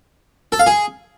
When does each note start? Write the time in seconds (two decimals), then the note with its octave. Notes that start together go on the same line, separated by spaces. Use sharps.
0.52 A4
0.59 F5
0.67 G#4